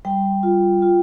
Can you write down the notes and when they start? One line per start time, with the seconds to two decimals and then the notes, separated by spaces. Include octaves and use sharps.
0.05 G3 G5
0.43 F4
0.82 F4